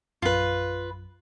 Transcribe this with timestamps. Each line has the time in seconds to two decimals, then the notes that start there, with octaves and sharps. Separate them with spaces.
0.22 A#1 F#2 F4 B4